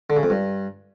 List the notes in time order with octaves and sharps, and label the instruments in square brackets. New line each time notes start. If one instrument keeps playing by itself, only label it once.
[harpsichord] D3
C#3
F2
G2